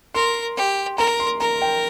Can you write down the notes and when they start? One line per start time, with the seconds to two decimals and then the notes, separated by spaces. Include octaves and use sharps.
0.14 A#4 C6
0.57 G4
0.98 A#4 A#5
1.20 C6
1.40 A#4 A#5
1.62 G5